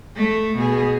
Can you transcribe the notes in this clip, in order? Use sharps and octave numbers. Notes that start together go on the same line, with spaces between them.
A3
B2 G#4